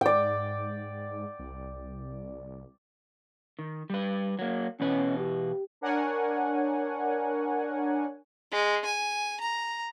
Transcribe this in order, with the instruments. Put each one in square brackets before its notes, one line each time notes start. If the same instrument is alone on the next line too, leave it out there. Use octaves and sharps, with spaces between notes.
[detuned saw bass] G#2 [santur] D5 G5
[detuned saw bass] C2
[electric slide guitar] D#3
G3 B4
F#3 A#3
[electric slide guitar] E2 B2 B4 [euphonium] C#4
[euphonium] G4
[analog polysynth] D4 A#4 C#5 F#5 G#5
[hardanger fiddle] G#3
G#5
A#5